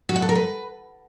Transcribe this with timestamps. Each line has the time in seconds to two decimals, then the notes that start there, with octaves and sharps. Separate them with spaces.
0.09 F#4
0.16 F#5
0.22 A4
0.29 A#4
0.35 B4